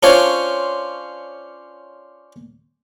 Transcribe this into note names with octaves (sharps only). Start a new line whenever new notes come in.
C#4 D4 F4 C5 C#5